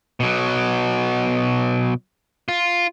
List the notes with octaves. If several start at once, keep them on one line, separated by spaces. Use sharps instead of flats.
B2 F#3
F4